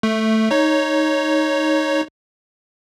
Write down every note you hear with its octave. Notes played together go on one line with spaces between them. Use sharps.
A3
D#4 C#5